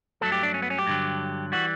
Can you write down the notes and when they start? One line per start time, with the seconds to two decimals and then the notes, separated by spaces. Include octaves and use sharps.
0.21 G2 F#3 A3 A4
0.32 G4
0.43 D4
0.54 C#4
0.62 B3
0.70 C#4
0.78 G4
0.87 G2 D3 F#3
1.52 E3 G3 F#4